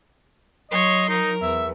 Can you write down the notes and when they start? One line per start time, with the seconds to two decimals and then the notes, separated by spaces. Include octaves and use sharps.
0.71 F#3 C#5 D#5 C6
1.09 D#4 A#4
1.42 E2 E5